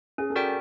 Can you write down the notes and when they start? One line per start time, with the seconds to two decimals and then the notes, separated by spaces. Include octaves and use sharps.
0.18 C#4 G#4
0.30 A4
0.36 F#4 A#4 D5 G5